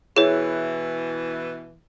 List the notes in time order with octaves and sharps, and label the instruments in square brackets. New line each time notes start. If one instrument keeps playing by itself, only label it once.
[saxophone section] B2 E3 [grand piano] E4 [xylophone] G#4 C#5